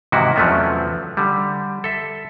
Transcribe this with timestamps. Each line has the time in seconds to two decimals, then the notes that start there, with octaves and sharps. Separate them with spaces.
0.12 G#2 C3 D#3 E3 E4 F#4
0.36 E2 F3 F#3 A3 B3 C#4
1.17 D3 G3
1.84 A4 E5